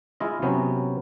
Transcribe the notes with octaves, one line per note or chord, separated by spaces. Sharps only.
G#3 E4 F4 D#5
C3 F#3 B3 C#4